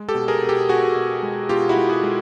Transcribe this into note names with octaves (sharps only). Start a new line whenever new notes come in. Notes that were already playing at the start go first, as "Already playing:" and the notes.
Already playing: G#3
G4 A4
B2
G#4 A#4
B2
G4 A4
B2 F#4 G#4
B2
G#3
B2 F4 G4
E4 F#4
G#3
F#4 G#4
G#3